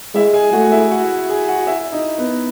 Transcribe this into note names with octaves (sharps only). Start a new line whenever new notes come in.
G#3 E4 E5
G#4 G#5
A3 F#4 F#5
E4 E5
F#4 F#5
G#4 G#5
F#4 F#5
E4 E5
D#4 D#5
B3 B4